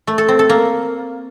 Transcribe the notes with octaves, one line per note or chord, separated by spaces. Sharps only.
A3
A4
C4
A4
A#3